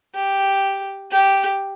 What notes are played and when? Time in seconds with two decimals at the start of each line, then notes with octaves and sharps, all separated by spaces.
0.14 G4
1.11 G4